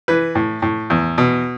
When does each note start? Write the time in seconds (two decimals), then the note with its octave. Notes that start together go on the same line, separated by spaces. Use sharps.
0.08 E3 B4
0.35 A2
0.62 A2
0.90 E2
1.18 B2